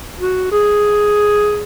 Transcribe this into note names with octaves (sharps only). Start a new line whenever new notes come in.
F#4
G#4